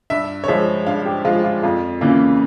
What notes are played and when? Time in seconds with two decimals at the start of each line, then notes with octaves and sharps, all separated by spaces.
0.10 G2 E5
0.44 C#5
0.48 F3 G#3 E5
0.87 G2 F5
1.05 G4
1.25 F3 G#3 F4
1.44 F4
1.63 F2 F4
2.01 C#3 E3 A#3 F4